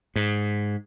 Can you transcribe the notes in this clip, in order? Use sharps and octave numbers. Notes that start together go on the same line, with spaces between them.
G#2